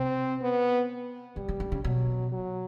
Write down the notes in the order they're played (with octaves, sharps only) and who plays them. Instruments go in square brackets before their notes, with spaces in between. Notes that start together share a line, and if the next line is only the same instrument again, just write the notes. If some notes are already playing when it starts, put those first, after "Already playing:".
Already playing: [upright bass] C3 [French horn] C4
[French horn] B3
[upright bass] C#3 [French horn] G3
[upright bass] C#3
D3
C#3
[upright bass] B2 [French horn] F#3
[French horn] F#3